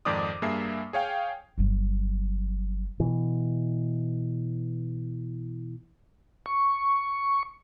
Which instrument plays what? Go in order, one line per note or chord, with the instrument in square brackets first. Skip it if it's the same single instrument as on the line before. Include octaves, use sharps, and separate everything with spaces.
[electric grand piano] F2 G#2 D#3 D5 D6 D#6
G2 A#3 G#4 E5 C7
G#4 C#5 F5 G5
[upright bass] G1 F#3
[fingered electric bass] B2 E3
[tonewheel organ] C#6